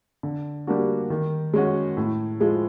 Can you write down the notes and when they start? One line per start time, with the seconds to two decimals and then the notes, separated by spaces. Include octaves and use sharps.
0.23 D3
0.67 G3 A#3 D4 F#4
1.10 D#3
1.53 G#3 C#4 F#4
1.97 A2
2.40 F3 G#3